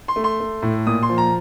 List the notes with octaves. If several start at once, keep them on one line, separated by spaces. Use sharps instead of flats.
C6
A3
C6
A3
A2
A#2 D#6
C6
F3
A#5